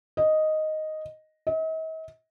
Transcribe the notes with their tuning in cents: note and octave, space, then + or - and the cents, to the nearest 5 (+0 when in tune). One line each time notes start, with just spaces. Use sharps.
D#5 +0
D#5 +45